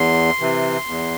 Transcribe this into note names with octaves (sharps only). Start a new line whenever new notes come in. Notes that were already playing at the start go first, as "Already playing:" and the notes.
Already playing: E2 C6
C3 E3
E2